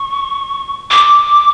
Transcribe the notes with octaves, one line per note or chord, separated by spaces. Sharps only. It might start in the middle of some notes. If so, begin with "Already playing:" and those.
Already playing: C#6
D6